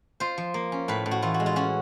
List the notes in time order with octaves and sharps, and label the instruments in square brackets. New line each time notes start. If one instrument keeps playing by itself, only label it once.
[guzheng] F4 C5
F3
A#3
C#4
A2 B4
A2
F#4
E3 F4
F#4
G#3
F4
C#4 F#4